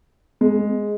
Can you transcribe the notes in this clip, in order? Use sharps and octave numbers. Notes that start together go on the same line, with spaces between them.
G#3